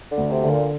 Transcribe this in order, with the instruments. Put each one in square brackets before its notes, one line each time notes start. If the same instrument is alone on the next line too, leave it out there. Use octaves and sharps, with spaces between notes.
[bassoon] D3
[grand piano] D2
[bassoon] C3
[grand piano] D3
[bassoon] A#2